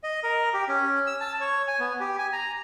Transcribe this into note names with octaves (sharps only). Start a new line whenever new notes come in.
D#5
A#4
G4
C#4
E6
A5
C#5
G#5
B3
G4
G#5
A#5